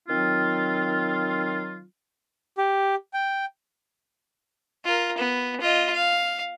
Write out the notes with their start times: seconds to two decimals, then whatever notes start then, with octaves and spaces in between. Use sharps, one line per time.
0.08 D#3 F#3 C4 F4
2.58 G4
3.14 G5
4.85 F4 A#4
5.18 B3
5.61 F4 D#5
5.93 F5